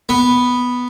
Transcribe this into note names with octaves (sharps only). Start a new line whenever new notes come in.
B3